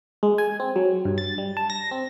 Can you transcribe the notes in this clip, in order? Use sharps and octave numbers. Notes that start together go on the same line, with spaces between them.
G#3
G#5
C4
F#3
G2
A6
G3
A5
A#6
C4